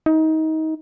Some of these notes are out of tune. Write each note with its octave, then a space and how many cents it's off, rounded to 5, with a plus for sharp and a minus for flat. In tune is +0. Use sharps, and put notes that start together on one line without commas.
D#4 +25